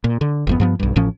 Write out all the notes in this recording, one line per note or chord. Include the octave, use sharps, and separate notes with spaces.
A#2
D3
G1 F2 B3
G2 F3 B3
B1 G2
A1 A2 F3 C#4